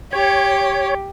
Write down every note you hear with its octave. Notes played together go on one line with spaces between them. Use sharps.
G4 C#5